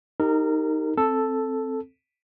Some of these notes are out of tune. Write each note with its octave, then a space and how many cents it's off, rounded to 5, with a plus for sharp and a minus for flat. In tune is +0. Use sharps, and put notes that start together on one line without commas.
D#4 +5 G4 +0 A#4 -25
C4 +5 A4 +0